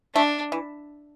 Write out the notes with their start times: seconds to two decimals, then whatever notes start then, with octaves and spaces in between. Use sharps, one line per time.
0.15 A3 D4
0.52 E3